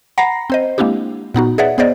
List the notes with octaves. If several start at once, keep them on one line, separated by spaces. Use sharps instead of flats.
F#5 A#5 B5 A#6 C7
C4 C5 D#5
G#3 A#3 C4 D4 E4 G4
A#2 B3 D#4 F#4
G#4 B4 C#5 D5 E5 F#5
B3 G#4 C5 D5 D#5